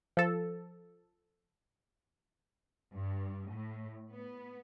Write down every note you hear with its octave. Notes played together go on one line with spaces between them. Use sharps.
F3 A4
G2
A2
B3